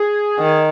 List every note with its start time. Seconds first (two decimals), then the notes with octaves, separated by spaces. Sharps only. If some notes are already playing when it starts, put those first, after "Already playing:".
Already playing: G#4
0.39 D#3